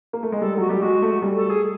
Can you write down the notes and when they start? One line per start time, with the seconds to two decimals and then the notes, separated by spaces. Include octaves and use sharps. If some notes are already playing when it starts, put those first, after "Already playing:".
0.13 A#3
0.23 A3
0.32 G#3
0.41 G3 A4
0.57 F#3 F#4
0.68 G3 G4
0.81 G#3 F#4
1.02 A3
1.22 G3
1.36 A4
1.49 G#4